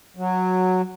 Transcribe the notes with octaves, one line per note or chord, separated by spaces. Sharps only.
F#3